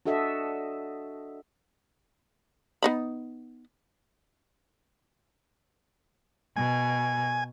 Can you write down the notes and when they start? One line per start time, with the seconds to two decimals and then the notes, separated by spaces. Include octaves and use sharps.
0.06 D4 F#4 A4 D#5 E5
2.83 B3 D#4 B5
6.56 B2 G#5